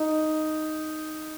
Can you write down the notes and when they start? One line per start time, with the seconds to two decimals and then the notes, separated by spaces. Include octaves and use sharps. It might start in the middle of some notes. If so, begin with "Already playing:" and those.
Already playing: D#4